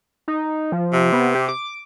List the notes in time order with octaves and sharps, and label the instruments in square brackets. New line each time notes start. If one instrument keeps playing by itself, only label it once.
[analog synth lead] D#4
F3
[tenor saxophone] C3
[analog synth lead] B3
G4
D6